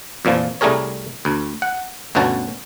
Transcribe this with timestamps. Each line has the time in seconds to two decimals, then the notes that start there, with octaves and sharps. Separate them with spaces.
0.25 F2 A#2 E3 F3
0.61 C2 G3 A3 G#4 A#4 C#5
1.25 D2
1.62 F#5
2.15 G1 D2 B2 C#4 F#4 A5